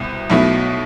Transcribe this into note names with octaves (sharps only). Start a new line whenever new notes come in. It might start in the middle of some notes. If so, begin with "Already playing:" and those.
Already playing: C2 B2 C4
B1 B2 A3 E4